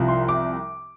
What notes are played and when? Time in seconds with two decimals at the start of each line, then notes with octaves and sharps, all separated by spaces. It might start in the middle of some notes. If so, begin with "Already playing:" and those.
Already playing: C2 C3 F3
0.08 C6
0.28 D6